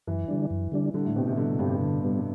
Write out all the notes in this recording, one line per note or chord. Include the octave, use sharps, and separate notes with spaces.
F#2 E3
D3 G3 D4
F#2
D3 G3 D4
D3 G3
A2
B2 C4 G4
C3
D3 G3
G2 C4 G4
D3
G3 B3